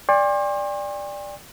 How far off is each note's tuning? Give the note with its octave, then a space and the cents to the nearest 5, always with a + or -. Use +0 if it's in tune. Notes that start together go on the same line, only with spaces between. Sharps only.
D5 +0 G5 +45 C6 +45